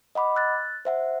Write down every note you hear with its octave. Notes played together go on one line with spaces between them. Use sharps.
D#5 F#5 B5 D6
E6 F#6 A6
C5 E5 F#5